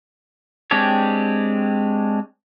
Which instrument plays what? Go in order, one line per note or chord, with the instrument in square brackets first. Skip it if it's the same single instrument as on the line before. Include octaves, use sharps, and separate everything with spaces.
[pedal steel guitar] G#3 C4 D4 G4 C#5